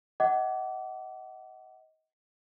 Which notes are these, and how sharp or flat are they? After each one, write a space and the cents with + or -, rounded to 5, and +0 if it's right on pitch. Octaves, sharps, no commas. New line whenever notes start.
D#5 +30 F#5 +30 D6 -15